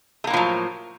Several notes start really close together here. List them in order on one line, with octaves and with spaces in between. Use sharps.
A3 A#3 A2 F3 F#3